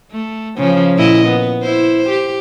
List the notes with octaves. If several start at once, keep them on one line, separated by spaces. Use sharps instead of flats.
A3
C#3 F3
A#2 E4 D#5
B3
E4 C5
G4